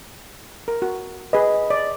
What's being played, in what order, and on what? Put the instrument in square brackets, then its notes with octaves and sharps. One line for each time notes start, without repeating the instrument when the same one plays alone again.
[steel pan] A#4
F#4
[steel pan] G#4 B4 [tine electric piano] D#5
[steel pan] D5